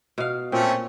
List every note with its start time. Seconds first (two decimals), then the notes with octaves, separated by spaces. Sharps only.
0.18 B2 F5
0.52 A#2 A3 C4 C#4